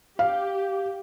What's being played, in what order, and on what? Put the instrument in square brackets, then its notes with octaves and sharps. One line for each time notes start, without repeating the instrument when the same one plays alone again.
[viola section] G4 [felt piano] F5